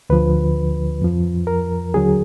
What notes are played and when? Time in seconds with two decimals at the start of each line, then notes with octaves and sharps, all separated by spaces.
0.10 D2 D3 F3 B4
1.02 F2 F3
1.47 A#4
1.94 D#2 D3 F#3 G#4